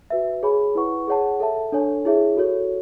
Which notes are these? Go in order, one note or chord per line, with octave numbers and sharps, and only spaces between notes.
F#4 B4 E5
G#4 C#5 G#5 B5
E4 B4 F#5 C#6
G#4 C#5 F#5 A5
A4 E5 A5
D4 A4 C#5 G#5
E4 G#4 C#5 E5
F#4 A4 C#5